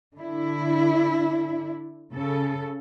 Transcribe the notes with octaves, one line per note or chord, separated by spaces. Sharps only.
D3 D4 E4
C#3 A4